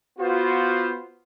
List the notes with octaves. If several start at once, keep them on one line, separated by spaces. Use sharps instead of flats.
B3 F4 F#4 C5